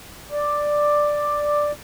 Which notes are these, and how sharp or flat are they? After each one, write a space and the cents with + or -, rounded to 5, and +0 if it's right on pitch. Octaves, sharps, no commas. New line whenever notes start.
D5 +5